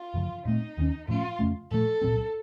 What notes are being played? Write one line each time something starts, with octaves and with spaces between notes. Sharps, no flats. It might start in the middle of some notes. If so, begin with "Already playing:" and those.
Already playing: F4
F#2 C#3 F3
A#2 A3 C4 D#4
D#2 D#3 A3 C#4
A2 F3 A3 C#4 F4
F2 C#3 A3 C#4
A#2 F3 A3 A4
C2 A#2 F#3 C4